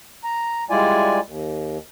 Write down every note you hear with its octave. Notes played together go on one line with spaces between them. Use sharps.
A#5
G3 G#3 E4 F4 D5 G#5
D#2